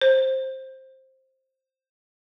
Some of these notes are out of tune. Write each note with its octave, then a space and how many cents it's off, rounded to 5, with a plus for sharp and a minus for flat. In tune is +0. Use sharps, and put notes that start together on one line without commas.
C5 +10